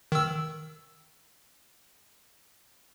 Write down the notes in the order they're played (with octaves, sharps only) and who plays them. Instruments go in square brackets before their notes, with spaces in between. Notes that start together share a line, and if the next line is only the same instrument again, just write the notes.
[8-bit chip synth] D#3 E6